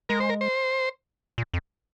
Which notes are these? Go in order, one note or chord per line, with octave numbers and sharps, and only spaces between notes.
G#3 A#4
C5
A#4
C5
A#2
F2